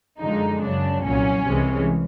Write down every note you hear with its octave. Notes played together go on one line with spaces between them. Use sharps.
F#2 D3 F3 G#3 D#4
F#2 C#3 F#3 D4
C2 A#2 F#3 C#4
C2 C3 E3 G#3